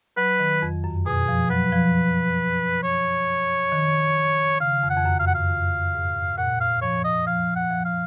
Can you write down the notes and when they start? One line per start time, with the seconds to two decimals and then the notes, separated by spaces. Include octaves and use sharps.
0.17 F#3 B4
0.39 D#3
0.62 F2
0.84 F#2
1.06 B2 G#4
1.28 F3
1.50 F#3 B4
1.72 F3
2.83 C#5
3.72 D#3
4.60 C#3 F5
4.83 F2
4.90 F#5
4.96 F2
5.05 F#2
5.20 F5
5.27 F#2 F#5
5.35 F5
5.50 F2
5.94 G#2
6.38 A#2 F#5
6.61 F5
6.82 F3 C#5
7.04 D#5
7.27 F3 F5
7.56 F#5
7.70 F3
7.85 F5